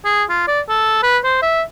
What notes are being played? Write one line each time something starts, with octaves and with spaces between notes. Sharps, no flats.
G#4
F4
D5
A4
B4
C5
E5